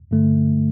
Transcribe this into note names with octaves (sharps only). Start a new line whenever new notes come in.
G2 D3 A3